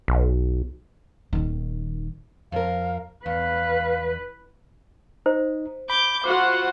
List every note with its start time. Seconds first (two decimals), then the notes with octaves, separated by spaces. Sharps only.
0.08 B1
1.33 D#1 D#3
2.52 F2 A#4 F5
3.26 E2 B4 F5
5.26 D#4 C5
5.90 B5 D6 G6
6.24 F4 F#4 C5 F#5 D6